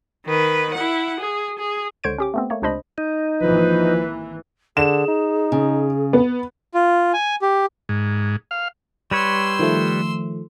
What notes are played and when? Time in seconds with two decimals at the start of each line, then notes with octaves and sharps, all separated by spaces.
0.26 D#3 B4
0.74 E4 F#5
1.20 G#4
1.59 G#4
2.04 C#2 D3 C5 C#5 G#6 D7
2.18 C#4 G4 D6
2.34 A3 B3 C4
2.50 A3 A#3 C#5
2.62 C#2 C3 D4 C5 D#5 B5
2.98 D#4
3.42 G#1 E3 F3 A#3 B4
4.77 D3 G#4 E7
5.08 D#4
5.52 C#3
6.13 B3
6.74 F4
7.13 G#5
7.42 G4
7.89 G#2
8.51 F5
9.11 G3 B4 C#5 C6 E6
9.59 D#3 F3 A3